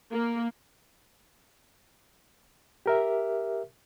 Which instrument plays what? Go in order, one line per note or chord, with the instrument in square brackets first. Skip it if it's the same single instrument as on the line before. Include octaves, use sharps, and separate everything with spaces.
[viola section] A#3
[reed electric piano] G4 A#4 E5